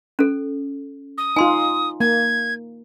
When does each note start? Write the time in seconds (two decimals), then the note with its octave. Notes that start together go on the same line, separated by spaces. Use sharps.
0.19 C#4 A4
1.18 D#6
1.36 D#4 F4 G#5 C6
2.00 A#3 G#6